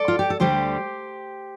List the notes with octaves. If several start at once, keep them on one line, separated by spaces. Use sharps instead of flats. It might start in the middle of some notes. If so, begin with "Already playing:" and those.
Already playing: A4 D5
F4
G4
A4
D2 D3 G3 G4 C5